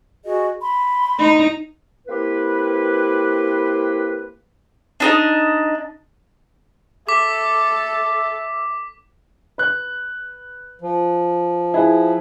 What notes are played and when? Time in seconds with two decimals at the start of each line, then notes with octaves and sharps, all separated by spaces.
0.24 F#4 G#4 D#5
0.61 B5 C6
1.19 D#4
2.08 A#3 C4 E4 G4 B4
5.00 D4 D#4 D#5
7.08 A4 E5 D6 B6
9.58 B4 F#6
10.81 F3
11.74 E4 G#4 B4